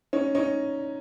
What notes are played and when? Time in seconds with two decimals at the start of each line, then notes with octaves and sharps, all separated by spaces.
0.13 C#4 D#4
0.35 C#4 D#4